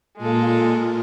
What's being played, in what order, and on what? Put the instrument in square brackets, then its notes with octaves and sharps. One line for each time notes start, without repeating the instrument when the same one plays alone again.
[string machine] A#2 A#3 F4 [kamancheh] G#3 A4